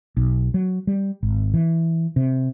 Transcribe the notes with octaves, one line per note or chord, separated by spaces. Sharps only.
B1
F#3
G3
G#1
E3
C3